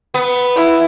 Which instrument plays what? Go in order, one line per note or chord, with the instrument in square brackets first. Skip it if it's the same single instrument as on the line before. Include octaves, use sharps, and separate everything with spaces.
[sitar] B3
[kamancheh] E4